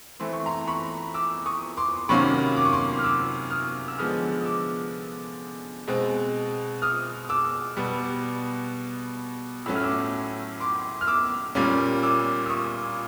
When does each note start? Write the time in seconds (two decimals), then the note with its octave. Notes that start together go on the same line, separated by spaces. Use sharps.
0.20 E3 A3 C4 C6
0.33 C#6
0.46 A#5 C6
0.68 B5 C#6
1.14 D6 E6
1.46 C#6 D#6
1.77 C6 D6
2.09 C3 D#3 F#3 A#3 C#4 B5 C#6
2.56 D6
2.65 C#6
2.73 C6 D6
2.99 F6
3.03 D6 E6
3.50 D#6 F6
3.88 E6
3.98 D3 F3 G#3 B3 D#6 F6
4.41 D#6
4.45 D6 E6
5.88 B2 G#3 C4
6.82 D#6 F6
7.29 D6 E6
7.77 B2 G3 B3
9.66 A2 F#3 A3 C#4 E6
9.75 F6
9.84 D6 E6
10.60 C6 D6
11.01 F6
11.07 D6 E6
11.55 A#2 G3 A#3 C#4
12.03 D6 E6
12.46 E6
12.49 C#6 D#6